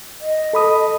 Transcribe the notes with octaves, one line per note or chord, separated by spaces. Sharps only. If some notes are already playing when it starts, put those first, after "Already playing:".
D#5
A4 B5 D#6